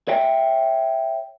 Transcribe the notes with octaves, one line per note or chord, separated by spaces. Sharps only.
C#5 E5 G5